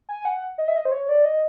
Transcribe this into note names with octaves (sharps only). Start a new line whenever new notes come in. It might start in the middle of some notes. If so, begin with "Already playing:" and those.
G#5
F#5
D#5
E5
D#5
C5
C#5
D5
D#5